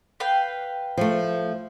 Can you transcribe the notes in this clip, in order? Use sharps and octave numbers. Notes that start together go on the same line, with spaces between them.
B4 F5 G5
F3 A3